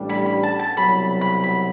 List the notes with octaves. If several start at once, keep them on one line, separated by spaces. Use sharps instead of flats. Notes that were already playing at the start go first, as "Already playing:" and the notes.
Already playing: A1 A2 G3 D4
B5
B5
A5
A5
C2 B2 F#3 B5
B5
B5